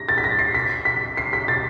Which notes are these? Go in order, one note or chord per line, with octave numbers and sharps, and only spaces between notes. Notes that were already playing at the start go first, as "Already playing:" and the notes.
Already playing: A#6
A6
B6
A#6
C7
B6
B6
C7
B6
A6